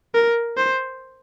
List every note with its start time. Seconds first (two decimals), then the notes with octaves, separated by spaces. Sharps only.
0.14 A#4
0.57 C5